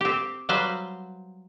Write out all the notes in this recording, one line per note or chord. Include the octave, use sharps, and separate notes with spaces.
C4 G4
F#3 G3 B4 C5 F5